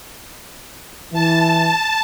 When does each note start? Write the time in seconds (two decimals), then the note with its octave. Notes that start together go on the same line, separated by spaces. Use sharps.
1.13 E3 A5